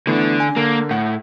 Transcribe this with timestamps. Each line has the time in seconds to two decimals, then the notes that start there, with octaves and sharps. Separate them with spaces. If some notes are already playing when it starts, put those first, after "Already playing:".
0.07 D3 E3 A3 B3 D4
0.40 G#5
0.56 D3 A#3 A#4
0.91 A2 F#5